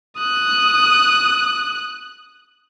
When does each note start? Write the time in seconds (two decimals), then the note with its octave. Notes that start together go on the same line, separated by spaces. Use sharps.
0.18 D#6 F#6